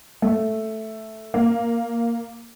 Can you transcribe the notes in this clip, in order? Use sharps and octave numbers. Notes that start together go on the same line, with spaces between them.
A3
A#3